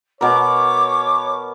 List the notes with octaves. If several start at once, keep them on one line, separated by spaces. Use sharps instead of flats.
B2 A#4 C#5 D6